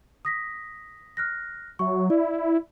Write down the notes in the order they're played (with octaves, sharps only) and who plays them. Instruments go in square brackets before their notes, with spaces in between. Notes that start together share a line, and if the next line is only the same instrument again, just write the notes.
[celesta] D#6 A#6 B6
F6 F#6 A#6
[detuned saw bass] F#3 [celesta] E5 C#6
[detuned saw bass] E4 [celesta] D5